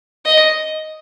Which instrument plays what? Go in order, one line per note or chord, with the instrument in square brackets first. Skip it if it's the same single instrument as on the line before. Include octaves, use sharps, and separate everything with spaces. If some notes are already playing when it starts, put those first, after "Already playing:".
[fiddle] D#5